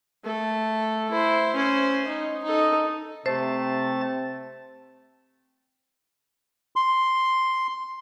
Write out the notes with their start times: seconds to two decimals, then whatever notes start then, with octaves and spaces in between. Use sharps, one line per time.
0.24 A3 A4
1.11 E4 C5
1.56 C#4 C5
2.08 D#4
2.44 D#4 A4
3.26 C3 A3 C4 C5 A5 A6
6.76 C6